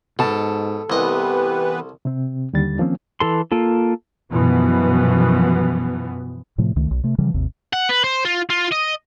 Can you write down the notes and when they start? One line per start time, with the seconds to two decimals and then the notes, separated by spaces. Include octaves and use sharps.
0.19 G#2 B2 A4 A5
0.90 C2 E3 B3 G4 B4 D#5
2.05 C3 C4
2.53 D#2 D3 G3 A6
2.78 D#3 F3 A#3 C4 C#4
3.20 E3 A4 C6
3.52 A#3 F4 A4
4.31 F#2 B2 E3 F3 B3
6.58 A2 C3 F3 A3
6.76 C#2 D#3 A3
6.91 B1
7.04 C3 A3
7.18 C#3 E3 F3 G3
7.34 G#1 D#2 C3
7.73 F#5
7.89 B4
8.04 C5
8.25 F4
8.50 F4
8.72 D#5